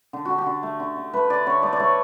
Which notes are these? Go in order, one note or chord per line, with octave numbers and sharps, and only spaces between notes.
D3
D3 F#4
G4
D3
A3
D3
D3
A3 B4
D3 D5
D3 C#5
A3 D5
D5
A3 C#5